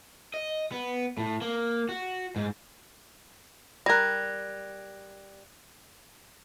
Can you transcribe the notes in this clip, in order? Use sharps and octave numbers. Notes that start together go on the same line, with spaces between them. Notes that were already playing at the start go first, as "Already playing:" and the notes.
D#5
B3
A2
A#3
F#4
G#2
G3 A#4 F#6 G#6 A#6